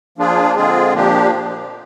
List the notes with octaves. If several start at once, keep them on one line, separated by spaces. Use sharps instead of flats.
F3 A#3 D4 F4 G#4
D3 G#3 C4 F4 G#4
A#2 F3 A#3 D4 G4